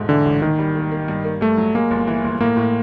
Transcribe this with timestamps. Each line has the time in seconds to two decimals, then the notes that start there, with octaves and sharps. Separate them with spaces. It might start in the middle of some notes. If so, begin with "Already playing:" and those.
Already playing: E1 G#2 A3
0.09 D3 E3
0.25 A1
0.42 D#3 A#3
0.59 G3
0.75 A#3
0.92 A#3
1.08 G2
1.24 A#3
1.41 G2 A3
1.57 F#3
1.75 G#3 A#3
1.91 G1
2.07 E3
2.24 G1
2.40 A2 A#3
2.57 A2